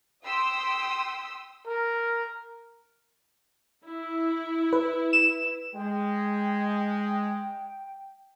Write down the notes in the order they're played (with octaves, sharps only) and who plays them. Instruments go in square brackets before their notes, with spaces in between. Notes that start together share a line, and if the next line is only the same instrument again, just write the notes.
[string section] G5 C6 D#6 E6 B6
[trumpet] A#4
[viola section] E4
[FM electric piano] B4
[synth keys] E7
[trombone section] G#3 [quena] G5